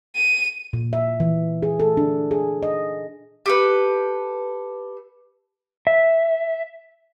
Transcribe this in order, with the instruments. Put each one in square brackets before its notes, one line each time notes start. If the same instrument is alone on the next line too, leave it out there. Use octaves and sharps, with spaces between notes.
[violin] D#7
[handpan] A#2
E5
E3
G#4
A4
D4
G#4
D#5
[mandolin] G4 A4 B4
[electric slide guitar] E5